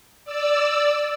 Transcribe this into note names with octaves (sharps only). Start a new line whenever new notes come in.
D5 E6